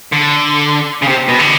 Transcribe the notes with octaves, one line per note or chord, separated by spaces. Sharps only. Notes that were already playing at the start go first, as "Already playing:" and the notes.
D3
C#3
C3
B2
D3